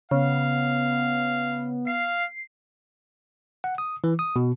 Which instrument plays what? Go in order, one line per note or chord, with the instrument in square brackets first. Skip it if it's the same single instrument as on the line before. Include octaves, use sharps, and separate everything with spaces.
[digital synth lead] C#3 [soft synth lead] B3 [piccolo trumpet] F5
[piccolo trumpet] F5 [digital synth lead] C7
[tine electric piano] F#5
D#6
E3
D#6
B2